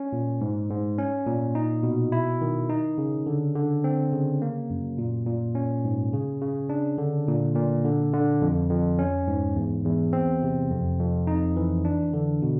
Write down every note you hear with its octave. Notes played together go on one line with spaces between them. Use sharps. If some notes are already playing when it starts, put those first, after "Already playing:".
Already playing: C#4
A#2
G#2
G#2
C#4
A#2
D#4
B2
E4
D#3
D#4
C#3
D3
D3
C4
C#3
A#3
F#2
A#2
A#2
C#4
G#2
C#3
C#3
D4
D3
A#2
A#2
D3
D3
F2
F2
C#4
G#2
E2
E2
C4
C3
F2
F2
D#4
E3
D4
D3
B2